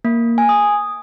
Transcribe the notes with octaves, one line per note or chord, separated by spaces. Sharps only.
A#3
G#5
D#6